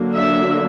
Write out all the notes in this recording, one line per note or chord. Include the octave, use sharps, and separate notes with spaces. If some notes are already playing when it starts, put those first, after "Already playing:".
Already playing: D3 F#3 A#3 D4
E5